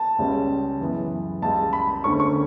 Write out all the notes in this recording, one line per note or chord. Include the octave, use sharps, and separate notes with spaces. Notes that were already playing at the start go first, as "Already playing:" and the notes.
Already playing: A5
C#2 C#3 G3 C#4
F#2 E3 B3
C#2 C#3 G3 A5
B5
D2 D3 A3 C#4 C#6
C#6